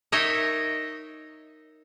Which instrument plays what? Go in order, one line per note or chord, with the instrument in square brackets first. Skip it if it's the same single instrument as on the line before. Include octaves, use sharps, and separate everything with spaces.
[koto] D#4 A#4 C#5 D#5 E5